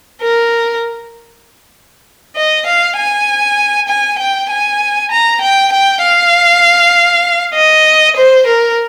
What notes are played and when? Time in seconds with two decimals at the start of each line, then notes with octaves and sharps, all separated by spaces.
0.22 A#4
2.36 D#5
2.66 F5
2.97 G#5
3.88 G#5
4.19 G5
4.50 G#5
5.11 A#5
5.41 G5
5.72 G5
6.02 F5
7.54 D#5
8.17 C5
8.47 A#4